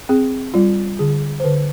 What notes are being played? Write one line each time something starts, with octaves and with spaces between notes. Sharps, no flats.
C4 G#4
G3 F4
D3 G#4
C5
D3 B4